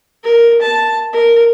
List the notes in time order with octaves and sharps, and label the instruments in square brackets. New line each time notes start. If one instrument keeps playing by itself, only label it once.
[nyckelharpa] A#4
A5
A#4